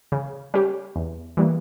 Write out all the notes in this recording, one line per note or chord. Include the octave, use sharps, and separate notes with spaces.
C#3
G3 C#4 G4
E2
E3 G3 A#3